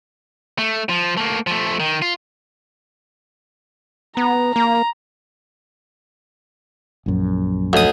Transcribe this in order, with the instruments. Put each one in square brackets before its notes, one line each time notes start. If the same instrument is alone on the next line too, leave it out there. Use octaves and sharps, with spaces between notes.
[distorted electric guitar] A3
F3
A3 A#3
F3 A3
D#3
F4
[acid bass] B3 [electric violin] A#5
[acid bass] A#3 [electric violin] A#5
[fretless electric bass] A#1 F#2
[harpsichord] D2 D#6